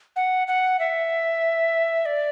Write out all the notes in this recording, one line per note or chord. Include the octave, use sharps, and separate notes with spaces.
F#5
F#5
E5
D5